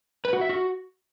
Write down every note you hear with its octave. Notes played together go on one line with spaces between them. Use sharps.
B4
F#4
E5
F#4